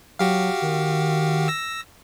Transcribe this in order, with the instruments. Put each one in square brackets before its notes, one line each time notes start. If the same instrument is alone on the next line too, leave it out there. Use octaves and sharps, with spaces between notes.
[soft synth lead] F#3 [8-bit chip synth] F#4 G4 F5
[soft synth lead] D#3
[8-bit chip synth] E6 A#6